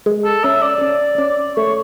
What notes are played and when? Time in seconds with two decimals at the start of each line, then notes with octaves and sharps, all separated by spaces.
0.06 G#3
0.25 A4
0.44 C#4 E5
0.62 D5
0.81 C#4
1.18 C#4
1.56 A3 C#5